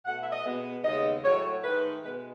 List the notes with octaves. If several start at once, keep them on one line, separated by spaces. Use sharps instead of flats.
B2 A3 F#5
E5
D#5
B2 G#3 B3
D#2 C#3 G#3 B3 D#5
A2 F#3 A3 C#5
G#2 D#3 A3 B4
B2 G#3 B3 B4